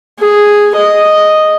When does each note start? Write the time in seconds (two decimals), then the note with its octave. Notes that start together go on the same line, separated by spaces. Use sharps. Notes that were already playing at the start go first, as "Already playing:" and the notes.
0.19 G#4
0.76 D#5